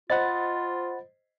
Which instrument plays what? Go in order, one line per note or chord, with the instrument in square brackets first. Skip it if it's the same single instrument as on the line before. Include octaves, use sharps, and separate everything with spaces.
[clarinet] F4 [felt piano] C5 D#5 [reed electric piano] F#5 B5 A6